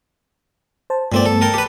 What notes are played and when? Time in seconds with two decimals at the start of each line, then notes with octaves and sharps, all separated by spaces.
0.90 C5 A5
1.12 G2 A#2 A3 B3 C4 D5
1.26 A4
1.41 A4 A#4 G5
1.54 G4 B4